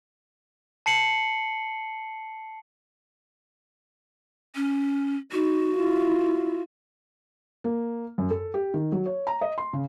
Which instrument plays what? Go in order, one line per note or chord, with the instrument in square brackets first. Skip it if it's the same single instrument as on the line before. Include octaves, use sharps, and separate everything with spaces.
[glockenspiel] A5 C7 C#7 F#7
[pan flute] C#4
[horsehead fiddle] D#4 [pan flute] F#4
[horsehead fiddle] E4 F4
[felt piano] A#3
F#2
A4
G4
D#3
F#3
C#5
A#5
D#5
C6
C#3